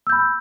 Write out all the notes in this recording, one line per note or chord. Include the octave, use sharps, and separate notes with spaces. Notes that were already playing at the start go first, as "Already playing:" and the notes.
B5 E6 G6